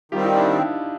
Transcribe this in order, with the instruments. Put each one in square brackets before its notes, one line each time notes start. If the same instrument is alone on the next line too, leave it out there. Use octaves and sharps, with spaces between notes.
[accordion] D#3 G3 C4 [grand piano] F4 G4
[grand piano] D#4 F4
D4 E4